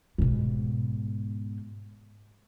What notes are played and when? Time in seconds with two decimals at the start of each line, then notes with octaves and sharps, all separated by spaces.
0.18 G#2 B2